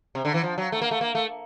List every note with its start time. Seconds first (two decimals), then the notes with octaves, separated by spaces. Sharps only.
0.15 C3
0.25 D3
0.34 E3
0.43 F3
0.58 F#3
0.72 A3
0.82 A#3
0.91 A3
1.01 A#3
1.15 A3